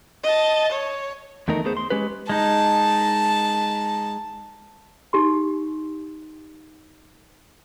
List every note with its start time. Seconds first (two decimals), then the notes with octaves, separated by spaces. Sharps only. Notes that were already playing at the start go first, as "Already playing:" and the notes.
0.24 D#5 A5
0.72 C#5
1.48 E2 D#3 A3 D#4 A#4
1.64 A3 B3 G#4 C5
1.77 C6
1.90 G#3 C#4 G4 B4
2.29 G#3 D#4 A5
5.13 D#4 G4 C6